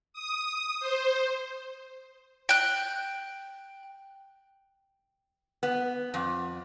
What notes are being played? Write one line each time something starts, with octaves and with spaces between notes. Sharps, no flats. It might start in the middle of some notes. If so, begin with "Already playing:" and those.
D#6
C5
G5 F#6
B3
F2